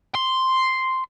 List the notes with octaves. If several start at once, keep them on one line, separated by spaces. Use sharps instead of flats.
C6